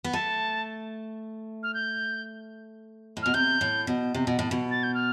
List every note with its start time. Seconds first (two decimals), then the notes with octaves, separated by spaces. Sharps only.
0.04 B3
0.13 A3 A5
1.63 F6
1.74 G6
3.17 A2
3.23 B2 F6
3.34 C3 G6
3.61 A2
3.87 B2
4.14 C3
4.27 B2
4.39 A2
4.51 B2
4.71 A6
4.83 G6
4.94 F6